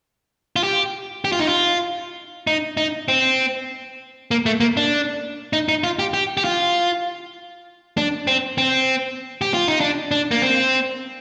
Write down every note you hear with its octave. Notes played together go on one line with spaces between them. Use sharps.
F4
G4
G4
F4
D#4
F4
D#4
D#4
C4
A#3
A3
A#3
D4
D#4
D#4
F4
G4
G4
G4
F4
D4
C4
C4
G4
F4
D#4
D4
D4
A#3
C4